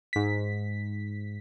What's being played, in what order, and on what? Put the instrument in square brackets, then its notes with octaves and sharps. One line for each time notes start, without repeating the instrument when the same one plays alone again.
[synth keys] G#2 B6